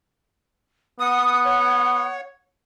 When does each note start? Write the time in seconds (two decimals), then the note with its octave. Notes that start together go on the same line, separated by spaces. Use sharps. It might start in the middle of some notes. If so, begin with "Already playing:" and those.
1.00 B3 F#5 D#6
1.46 C#5